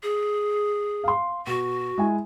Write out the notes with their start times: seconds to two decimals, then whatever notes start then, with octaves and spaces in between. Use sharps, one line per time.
0.03 G#4
1.04 F5 C6
1.47 B2 F#4
1.98 G#3 E4 G#5